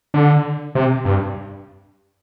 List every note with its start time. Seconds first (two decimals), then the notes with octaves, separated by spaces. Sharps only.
0.14 D3
0.75 C3
1.05 G2